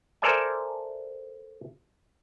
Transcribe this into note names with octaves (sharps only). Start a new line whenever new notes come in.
A4 A#4 C5 D5 E5 G#5